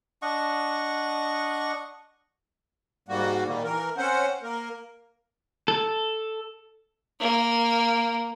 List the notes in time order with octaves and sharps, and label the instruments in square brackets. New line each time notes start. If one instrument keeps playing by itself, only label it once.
[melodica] D4 D#5 F#5 C#6
[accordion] G#2 G3 A#3 F#4
A#2 D#3 G3 A#3
E3 A#4
C4 C#4 C5 F#5
A#3 A#4
[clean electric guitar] A4
[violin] A#3